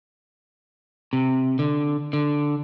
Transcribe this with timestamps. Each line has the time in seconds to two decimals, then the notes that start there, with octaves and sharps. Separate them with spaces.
1.13 C3
1.59 D3
2.13 D3